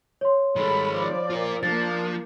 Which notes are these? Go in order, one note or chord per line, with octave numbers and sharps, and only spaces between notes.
C#5 C6
D#3 G3 G#3 A4 B5
F3 D5
F4 A#4
F3 A#3 D4 A6